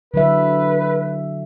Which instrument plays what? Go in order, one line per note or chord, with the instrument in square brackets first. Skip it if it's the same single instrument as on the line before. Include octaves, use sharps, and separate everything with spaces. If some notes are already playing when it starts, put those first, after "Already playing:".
[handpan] D3 F#3 E5 [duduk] B4